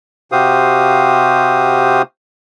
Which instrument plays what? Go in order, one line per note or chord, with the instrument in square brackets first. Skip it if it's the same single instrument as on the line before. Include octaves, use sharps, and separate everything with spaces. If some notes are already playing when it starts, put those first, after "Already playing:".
[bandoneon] C3 F#4 G4 C5 F5 D#6